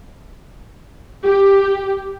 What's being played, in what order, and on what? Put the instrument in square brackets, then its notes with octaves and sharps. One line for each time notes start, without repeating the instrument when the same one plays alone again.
[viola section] G4